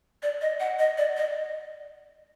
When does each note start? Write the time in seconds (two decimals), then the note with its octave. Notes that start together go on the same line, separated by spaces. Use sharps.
0.22 D5
0.41 D#5
0.60 F#5
0.79 D#5
0.98 D5
1.16 D#5